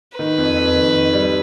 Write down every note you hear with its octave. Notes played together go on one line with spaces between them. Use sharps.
D#3 B4
F2
F2
D#3
D#3
G3